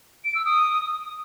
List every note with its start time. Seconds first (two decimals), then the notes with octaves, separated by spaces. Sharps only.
0.25 D7
0.35 E6
0.45 D#6